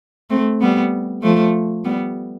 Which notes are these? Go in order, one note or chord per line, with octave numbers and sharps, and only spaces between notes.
A3 C4
G3 B3
F3 A3
G3 B3